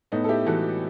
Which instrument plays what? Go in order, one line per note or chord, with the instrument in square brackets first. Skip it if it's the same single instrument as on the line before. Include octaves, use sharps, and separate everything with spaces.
[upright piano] A2 B3 D#4
A4
E4 G4
E3 F#4 A4